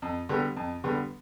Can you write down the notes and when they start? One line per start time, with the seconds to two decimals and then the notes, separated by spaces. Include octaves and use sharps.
0.02 F2
0.29 D3 G3 B3
0.57 F2
0.84 D3 G3 B3